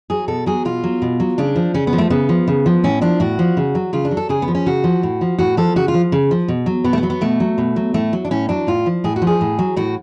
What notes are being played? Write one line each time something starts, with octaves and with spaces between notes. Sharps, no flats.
F#3 G#4
B2 A4
F#3 G#4
B2 F4
F#3
B2
F#3
C#3 D4
F3
C#3 C#4
B3
F3
A3
C#3 B3
F3
C#3
F3
A2 C#4
F3 D4
A2 F#4
F3
C#3
F#3
C#3 F4
D4
F#3
A4
C#3 G#4
B3
F3
C#4
C#3 F#4
F3
A2
F3
A2 F#4
F3 A4
C#3 F#4
F4
F3
C#3
F3
B2
F#3
B2 B3
A3
B3
F#3
B3
B2 A3
F#3
B2
F#3
A2 A3
F#3
D4
A2 C#4
F#3 D4
A2 F4
F3
A2 G#4
F#4
F3
G#4
A2
F#3
A2 F#4